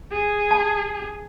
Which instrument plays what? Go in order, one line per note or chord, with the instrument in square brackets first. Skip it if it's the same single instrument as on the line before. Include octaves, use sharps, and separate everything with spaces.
[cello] G#4
[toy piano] A5